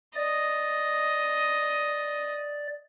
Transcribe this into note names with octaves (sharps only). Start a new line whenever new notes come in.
D5 D#5